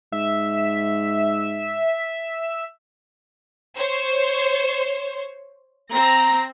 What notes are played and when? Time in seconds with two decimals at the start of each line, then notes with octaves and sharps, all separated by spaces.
0.12 G#2 E5
3.76 C5 C#5
5.91 C4 A#5 A#6